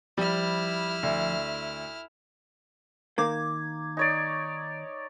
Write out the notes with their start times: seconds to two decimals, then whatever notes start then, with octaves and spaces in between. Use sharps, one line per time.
0.18 F3 G3 E4 F6
1.03 D2
3.18 D#3 A#3 D6 G#6
3.97 D#4 C#5 D5